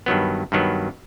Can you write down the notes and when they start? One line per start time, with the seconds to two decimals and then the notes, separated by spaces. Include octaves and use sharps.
0.06 G2 D#3 F#3 B3
0.52 G2 D#3 F#3 B3